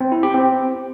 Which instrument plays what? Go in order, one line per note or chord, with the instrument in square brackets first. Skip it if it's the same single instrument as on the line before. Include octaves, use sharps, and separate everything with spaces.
[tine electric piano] C4
E4
G4
C4